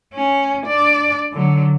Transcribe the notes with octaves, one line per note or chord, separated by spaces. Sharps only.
C#4
D4 D5
D3 F#3